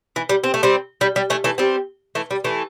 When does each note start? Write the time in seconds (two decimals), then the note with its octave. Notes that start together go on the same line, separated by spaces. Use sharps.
0.16 E3
0.29 G3
0.44 C4
0.54 A3
0.63 G3 C4
1.01 G3
1.16 G3
1.30 E3 A3
1.44 E3 A3
1.58 G3 C4
2.15 E3 A3
2.31 G3
2.44 E3 A3